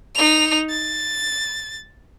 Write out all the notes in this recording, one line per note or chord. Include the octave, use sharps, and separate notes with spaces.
D#4 F7
A6